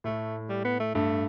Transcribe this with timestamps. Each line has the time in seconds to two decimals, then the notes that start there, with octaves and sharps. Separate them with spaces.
0.04 A2 A3
0.49 G3
0.65 B3
0.80 A3
0.95 G2 A3